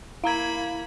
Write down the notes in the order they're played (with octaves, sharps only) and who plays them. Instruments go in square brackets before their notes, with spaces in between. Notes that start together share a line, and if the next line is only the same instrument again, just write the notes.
[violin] A#3 B5 [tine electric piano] E4 [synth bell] F5 A#5 G#6